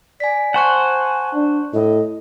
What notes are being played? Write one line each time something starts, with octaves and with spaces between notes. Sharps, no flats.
D5 G#5 B6
C5 F#5 G#5 A5 C#6 F#6
D4
A2 D#5